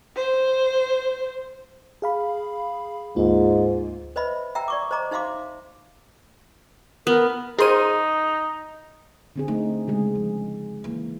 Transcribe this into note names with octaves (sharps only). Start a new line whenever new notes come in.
C5
G#4 F5 B5
D2 G#2 A#3 F4
B4 C5 D#5 E5 B5
E5 G5 A#5 E6
D5 C#6 D6
C5 D#5 A#5 D6
D#4 C5 E5 F5 C6 D6
B3 A#4
D#4 G#4 A#4 C5 C6 D#7
D3 C4 G#4
A3 C4 D#4
C#3 G#3 G#4
F3
E3 A#3